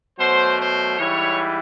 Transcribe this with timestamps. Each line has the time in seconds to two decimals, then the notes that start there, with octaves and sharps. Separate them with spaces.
0.18 B2 F#3 A3 C5
0.58 C5
0.98 G#2 E3 G3 C#5